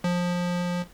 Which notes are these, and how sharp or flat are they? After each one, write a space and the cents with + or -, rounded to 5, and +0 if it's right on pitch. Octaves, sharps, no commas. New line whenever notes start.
F3 +20